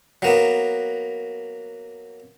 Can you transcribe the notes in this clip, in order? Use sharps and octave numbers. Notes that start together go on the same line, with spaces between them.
F#3 A#3 B3